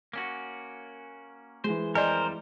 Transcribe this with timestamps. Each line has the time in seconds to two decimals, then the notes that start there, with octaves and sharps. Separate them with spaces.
0.13 A#3 C#4 F#4
1.64 E3 G#3 C5
1.95 F2 G3 A#4 C5 D5 D#5 G#5